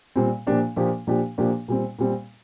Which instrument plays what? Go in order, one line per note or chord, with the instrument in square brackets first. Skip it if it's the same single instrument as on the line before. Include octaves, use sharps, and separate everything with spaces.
[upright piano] A#2 G3 C4
A#2 F3 A#3 D4 G4
A#2 F3 A#3 D4 G4
A#2 F3 A#3 D4 G4
A#2 F3 A#3 D4 G4
A#2 G3 C4
A#2 G3 C4